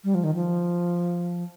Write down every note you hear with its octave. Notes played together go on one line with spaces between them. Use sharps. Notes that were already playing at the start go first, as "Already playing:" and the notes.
G3
F3
D#3
F3